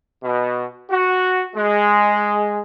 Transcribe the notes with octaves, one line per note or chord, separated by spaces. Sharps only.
B2
F#4
G#3